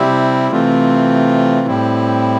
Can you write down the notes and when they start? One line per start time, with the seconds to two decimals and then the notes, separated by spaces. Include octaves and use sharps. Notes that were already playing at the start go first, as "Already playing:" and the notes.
Already playing: C3 G3 C4 E4
0.51 C3 E3 A3 C4 F4
1.67 A2 G3 C4 E4